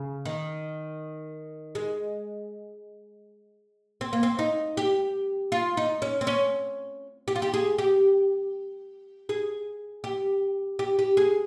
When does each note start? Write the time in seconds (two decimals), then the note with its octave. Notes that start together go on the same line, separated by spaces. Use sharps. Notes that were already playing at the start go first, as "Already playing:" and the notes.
Already playing: C#3
0.25 D#3
1.75 G#3
4.01 C4
4.13 A#3
4.23 C4
4.39 D#4
4.77 G4
5.52 F4
5.77 D#4
6.02 C#4
6.21 C4
6.27 C#4
7.28 G4
7.36 F4
7.42 G4
7.54 G#4
7.78 G4
9.29 G#4
10.04 G4
10.79 G4
10.99 G4
11.17 G#4